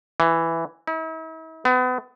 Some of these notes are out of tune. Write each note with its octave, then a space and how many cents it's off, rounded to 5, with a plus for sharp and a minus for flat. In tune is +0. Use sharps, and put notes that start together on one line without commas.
E3 +5
E4 -45
B3 +35